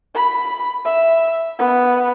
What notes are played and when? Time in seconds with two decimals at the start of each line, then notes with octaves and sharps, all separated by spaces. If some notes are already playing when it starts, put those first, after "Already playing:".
0.15 B5
0.85 E5
1.59 B3